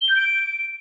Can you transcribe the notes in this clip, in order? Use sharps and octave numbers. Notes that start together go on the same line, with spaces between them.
G7
G6
D7